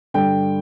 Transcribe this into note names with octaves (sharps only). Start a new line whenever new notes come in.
G2 D3 G5